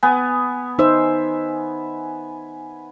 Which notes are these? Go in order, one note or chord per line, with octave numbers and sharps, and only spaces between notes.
B3 G#5
D#4 C5 E5